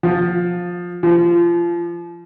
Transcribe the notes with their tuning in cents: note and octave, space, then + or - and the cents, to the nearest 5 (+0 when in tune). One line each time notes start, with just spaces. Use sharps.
F3 +15
F3 -25